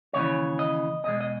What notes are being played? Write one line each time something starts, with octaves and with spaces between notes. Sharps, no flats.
D#2 C#3 E3 C#5
D#5
E2 B2 G#3 D#5
D#5